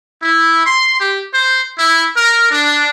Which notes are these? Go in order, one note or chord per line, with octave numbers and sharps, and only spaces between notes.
E4
C6
G4
C5
E4
A#4
D4